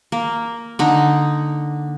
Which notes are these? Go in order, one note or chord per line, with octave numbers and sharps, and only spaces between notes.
A#3
D3 D#4